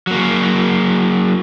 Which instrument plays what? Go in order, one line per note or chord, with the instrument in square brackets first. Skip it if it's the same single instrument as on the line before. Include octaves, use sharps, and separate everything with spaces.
[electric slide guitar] F#3 A#3